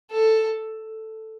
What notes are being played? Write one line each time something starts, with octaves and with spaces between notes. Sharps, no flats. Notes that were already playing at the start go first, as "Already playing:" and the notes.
A4